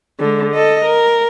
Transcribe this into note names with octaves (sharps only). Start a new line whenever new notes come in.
D3 G#3
A4 D#5
A#4